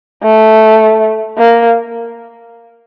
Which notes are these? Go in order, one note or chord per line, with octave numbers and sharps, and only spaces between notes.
A3
A#3